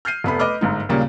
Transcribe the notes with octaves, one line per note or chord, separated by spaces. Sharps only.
F6 G6 C7 D#7
F1 A3 B3 B5
B4 D#5 B5 D6 F6
G1 G#2 D#4
D#2 A#2 C#3 G3 A#3